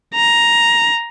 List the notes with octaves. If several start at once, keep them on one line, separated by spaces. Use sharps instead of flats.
A#5